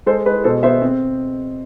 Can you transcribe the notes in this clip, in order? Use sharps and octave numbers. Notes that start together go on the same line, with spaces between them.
G#3 A4 C5
G#3 B4
B2 A4 C5
B3 C5 E5
C4